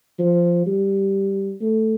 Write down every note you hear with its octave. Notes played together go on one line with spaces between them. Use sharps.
F3
G3
A3